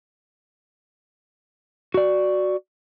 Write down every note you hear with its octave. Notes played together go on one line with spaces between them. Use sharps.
F#4 D5